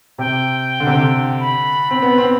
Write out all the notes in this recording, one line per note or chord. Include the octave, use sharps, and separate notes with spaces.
C3 G5
D3
C3
D3
B5
C4
B3
C4